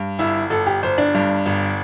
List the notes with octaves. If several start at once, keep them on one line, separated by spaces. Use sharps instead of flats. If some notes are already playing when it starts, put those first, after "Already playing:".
Already playing: G2
G1 E4
G1 A4
G4
G1 C5
D4
G2
G1